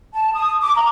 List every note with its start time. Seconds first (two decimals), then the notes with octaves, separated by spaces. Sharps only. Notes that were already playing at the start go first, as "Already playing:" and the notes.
0.13 A5
0.34 D#6
0.62 D6
0.75 A#5